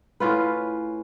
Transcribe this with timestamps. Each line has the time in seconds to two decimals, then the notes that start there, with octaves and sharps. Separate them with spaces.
0.20 A2 C#4 F4 B4